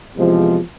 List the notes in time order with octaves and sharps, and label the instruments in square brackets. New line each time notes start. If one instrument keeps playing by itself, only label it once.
[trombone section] E2 C3 F3 G#3